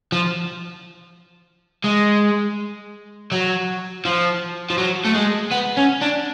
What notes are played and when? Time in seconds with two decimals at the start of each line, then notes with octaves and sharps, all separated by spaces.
0.12 F3
1.84 G#3
3.32 F#3
4.05 F3
4.70 F3
4.78 F#3
5.05 A3
5.15 G#3
5.52 B3
5.78 C#4
6.02 D4